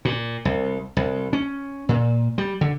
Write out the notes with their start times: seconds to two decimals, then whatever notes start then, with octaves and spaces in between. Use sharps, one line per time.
0.05 A#2
0.45 C2
0.97 C2
1.33 C#4
1.89 A#2
2.38 G3
2.61 D3